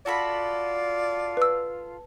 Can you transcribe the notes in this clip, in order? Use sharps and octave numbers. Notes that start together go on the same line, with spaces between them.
F4 F#4 A4 D5 B5
B4 E6